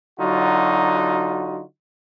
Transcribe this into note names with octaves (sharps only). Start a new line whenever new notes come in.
D3 F#3 D#4 F4 F#4